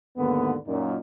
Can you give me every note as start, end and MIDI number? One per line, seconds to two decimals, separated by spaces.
0.18 0.55 39
0.18 0.55 44
0.18 0.55 50
0.18 0.55 58
0.18 0.55 59
0.67 0.97 42
0.67 0.97 46
0.67 0.97 63